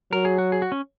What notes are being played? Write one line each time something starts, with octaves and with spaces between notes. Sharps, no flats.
F#3 A#4
G#4
F#4
G#4
F#4
C#4